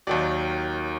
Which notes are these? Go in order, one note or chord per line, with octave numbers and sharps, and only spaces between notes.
D#2 D#3 F#3 D5